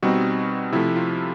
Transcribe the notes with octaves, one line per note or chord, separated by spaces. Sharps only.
B2 G3 C4 D#4 F#4
C3 F3 A3 E4
F4